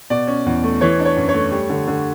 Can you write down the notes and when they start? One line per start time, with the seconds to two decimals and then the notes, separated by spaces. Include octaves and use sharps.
0.10 B2 D5
0.27 C#4
0.46 E2
0.63 A3
0.81 E3 C#5
0.99 D4
1.05 C#5
1.17 F#2
1.29 C#5
1.34 A3
1.52 G3
1.70 D3
1.88 D3